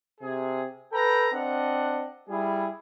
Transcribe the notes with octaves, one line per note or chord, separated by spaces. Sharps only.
C3 G#4
A4 B4 G5 A#5
C4 D4 D#5 F#5
G3 E4 G#4